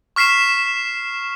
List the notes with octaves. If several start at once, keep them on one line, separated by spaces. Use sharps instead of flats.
C#6 F6 B6 C7 E7